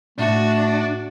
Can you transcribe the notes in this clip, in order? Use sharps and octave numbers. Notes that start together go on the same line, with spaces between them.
A2 A3 D4 F#4